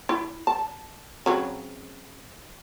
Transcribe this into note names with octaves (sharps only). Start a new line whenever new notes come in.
E4
A5
C#3 F#3 C4